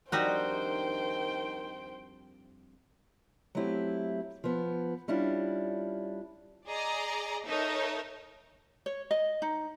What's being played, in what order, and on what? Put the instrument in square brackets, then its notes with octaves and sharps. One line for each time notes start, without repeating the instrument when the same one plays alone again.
[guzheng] F2 D4 [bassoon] D#3 [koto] G3 D#4 F#4 [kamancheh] C5 G5
[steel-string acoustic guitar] F#3 A3 C4 E4 G4
F3 B3
G3 C#4 D4 E4 F4
[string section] G#4 D5 D#5 A#5
D#4 A4 A#4 C#5 E5
[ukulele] C#5
D#5
D#4